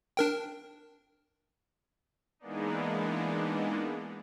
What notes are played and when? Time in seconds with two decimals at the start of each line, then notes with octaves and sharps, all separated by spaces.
0.17 D4 A#4 G5
2.39 E3 G#3 A#3 B3 D4 D#4